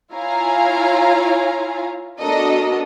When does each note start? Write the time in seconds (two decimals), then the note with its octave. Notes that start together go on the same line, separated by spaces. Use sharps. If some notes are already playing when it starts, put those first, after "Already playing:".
0.13 E4 F4 C#5 F5 G#5 A#5
2.19 B3 D4 F#4 A4 A#4 D#5